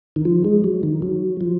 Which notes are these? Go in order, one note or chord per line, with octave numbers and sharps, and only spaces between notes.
D#3
F3
G#3
F#3
D#3
F#3
F3